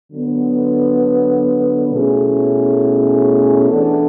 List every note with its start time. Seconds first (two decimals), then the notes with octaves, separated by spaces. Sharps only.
0.12 D3 F#3 B3
1.91 B2 A3 C#4 E4 G#4
3.70 E3 B3 D4 A4